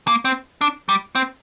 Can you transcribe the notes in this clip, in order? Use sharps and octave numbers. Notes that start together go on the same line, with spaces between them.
A#3
C4
D4
G3
C4